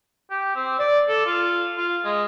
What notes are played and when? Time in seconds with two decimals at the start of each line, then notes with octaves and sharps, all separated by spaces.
0.31 G4
0.56 C4
0.79 D5
1.09 A4
1.26 F4
1.78 F4
2.05 G#3